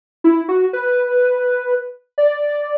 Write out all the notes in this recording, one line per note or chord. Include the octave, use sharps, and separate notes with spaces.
E4
F#4
B4
D5